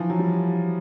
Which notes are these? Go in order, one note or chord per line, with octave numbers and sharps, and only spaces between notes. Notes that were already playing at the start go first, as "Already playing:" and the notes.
Already playing: E3 F3
F#3
G3